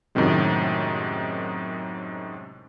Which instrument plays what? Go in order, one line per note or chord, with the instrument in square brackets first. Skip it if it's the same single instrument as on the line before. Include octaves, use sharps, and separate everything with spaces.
[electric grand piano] F#2 A2 C3 D#3 G#3